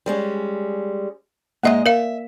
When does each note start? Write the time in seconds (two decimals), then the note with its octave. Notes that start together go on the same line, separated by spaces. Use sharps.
0.06 G3 G#3 C#4
1.63 G#2 G#3 A#3 D#5 E5 F#5
1.86 A#4 E5 F5